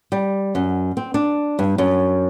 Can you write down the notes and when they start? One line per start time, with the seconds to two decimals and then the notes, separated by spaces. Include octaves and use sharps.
0.12 G3
0.55 F#2
0.97 C4
1.14 D4
1.59 G2
1.78 F#2